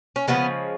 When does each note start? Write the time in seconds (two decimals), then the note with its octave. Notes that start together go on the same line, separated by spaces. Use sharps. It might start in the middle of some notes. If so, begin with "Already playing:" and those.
0.16 C#4
0.28 C#3 F3 G#3 B3